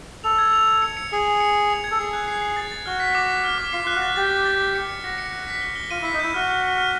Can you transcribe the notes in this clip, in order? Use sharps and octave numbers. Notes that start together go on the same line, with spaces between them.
A4 F7
G#6
F7
F7
C#7
C#7
G#4 C#7
C#7
C#7
F7
F7
G#6
A4
G#4 C7
F#6
C7
C7
A6
A6
F#4 F6
B6
D6
B6
F6
D6
F4 C7
F4 F#6
F#4
A6
G4 A6
F#6
A6
F#6
C#7
C#7
F#4 A#6
C#7
F#6
B6
G7
G7
F4 D#7
E4
B6
D#4
E4 G6
F#4 F6
F6
F6
F6